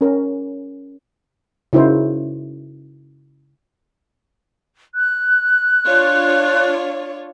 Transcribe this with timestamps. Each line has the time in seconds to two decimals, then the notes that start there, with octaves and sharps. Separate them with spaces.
0.01 C#4 A#4
1.73 C#3 D#4 E4 F#4 A#4 C5
4.95 F#6
5.86 D4 F4 C#5